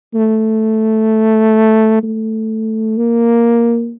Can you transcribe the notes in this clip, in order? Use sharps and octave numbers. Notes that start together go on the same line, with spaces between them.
A3
A3
A#3